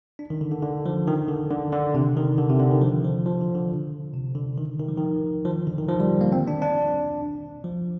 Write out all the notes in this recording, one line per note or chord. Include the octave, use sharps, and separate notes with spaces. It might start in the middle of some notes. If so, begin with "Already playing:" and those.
D4
D#3
D3
D3
D3
F3
D#3
D3
D3
D3
C3
D#3
D3
C3
D3
D#3
F3
F3
F3
D3
D3
C3
D3
D#3
D#3
F3
D#3
F3
D3
D#3
F3
G3
A#3
C4
D4
D4
F3